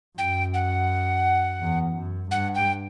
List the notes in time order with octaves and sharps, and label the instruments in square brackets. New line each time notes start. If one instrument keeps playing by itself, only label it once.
[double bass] F#2 [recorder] G5
[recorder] F#5
[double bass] E2
F#2
[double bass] G2 [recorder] F#5
[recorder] G5